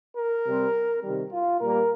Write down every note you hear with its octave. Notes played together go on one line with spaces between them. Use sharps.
A#4
C3 G3 C4
C3 D#3 G3
F4
A#2 G3 A#3 A#4